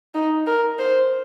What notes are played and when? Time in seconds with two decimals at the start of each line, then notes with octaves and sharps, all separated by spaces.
0.14 D#4
0.47 A#4
0.79 C5